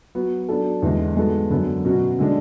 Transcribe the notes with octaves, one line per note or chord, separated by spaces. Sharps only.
F#3 B3 F#4
F#3 B3 D4 A4
E2 D3 G#3
G#2 G#3 B3 F#4 A4
F#2 D3 F#3 B3
B2 F#3 C#4 F#4
D3 G#3 D4